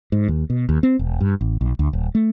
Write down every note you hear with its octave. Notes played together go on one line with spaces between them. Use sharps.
G#2
D#2
B2
D#2
C4
E1
G2
A1
B1
D2
D#1
A3